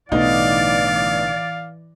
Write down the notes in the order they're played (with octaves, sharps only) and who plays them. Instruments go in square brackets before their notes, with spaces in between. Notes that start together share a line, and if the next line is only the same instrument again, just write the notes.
[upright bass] B1 D3 [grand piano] A2 B3 D#4 [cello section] E3 D5 [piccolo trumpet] F5